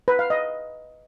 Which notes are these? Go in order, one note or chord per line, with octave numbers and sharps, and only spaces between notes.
B4
F5
D#5